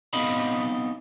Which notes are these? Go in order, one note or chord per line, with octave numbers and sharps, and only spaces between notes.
B3 C4 D#4 D#5 F5 B5